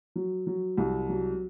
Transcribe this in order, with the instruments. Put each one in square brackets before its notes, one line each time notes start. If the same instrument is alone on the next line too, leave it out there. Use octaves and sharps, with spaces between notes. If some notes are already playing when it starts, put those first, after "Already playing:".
[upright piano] F#3
F#3
C2
F#3